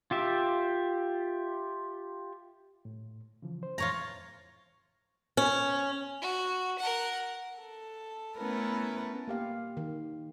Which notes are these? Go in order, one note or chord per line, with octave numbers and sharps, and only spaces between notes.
F4 G4 E5
A2
C#3 E3 F3
C5
F2 A2 E3 F4 C#5 A#5
C#4
F#4
A#4 F#5
A4
A3 B3 C#4 E4 A#4 B4
A#3 G4 F5
D#3